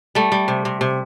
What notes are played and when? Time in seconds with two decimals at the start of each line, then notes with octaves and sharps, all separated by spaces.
0.15 G3 A3
0.32 G3
0.48 C3
0.65 C3
0.81 C3